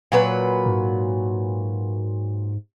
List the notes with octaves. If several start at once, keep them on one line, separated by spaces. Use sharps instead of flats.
A#2 F#3 B4
G#2